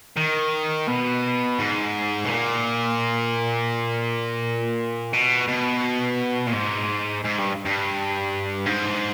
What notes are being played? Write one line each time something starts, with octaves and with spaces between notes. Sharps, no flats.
D#3
B2
G#2
B2
A#2
B2
B2
A#2
G#2
G#2
G2
G2
G#2